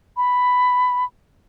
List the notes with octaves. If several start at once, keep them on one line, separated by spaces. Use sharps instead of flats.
B5